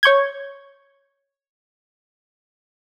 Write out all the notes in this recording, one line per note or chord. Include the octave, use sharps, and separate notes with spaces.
C#5 C#6 G6 G#6